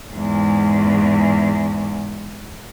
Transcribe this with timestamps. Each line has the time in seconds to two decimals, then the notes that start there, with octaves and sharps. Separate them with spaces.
0.11 E2 G#2